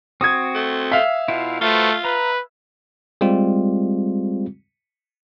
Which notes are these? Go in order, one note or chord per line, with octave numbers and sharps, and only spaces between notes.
C4 F#4 D#6 G#6
A3
E5 F5
B2 E4 F4
A3 F4 F#4 B4 C5
B4 A#5
G3 G#3 C4 F4 G4